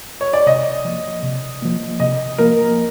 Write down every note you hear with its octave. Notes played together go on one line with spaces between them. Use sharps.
C#5
D5
C3 D#5
F3 A#3
C3
F3 A#3
C3 D#5
F3 A#3 A#4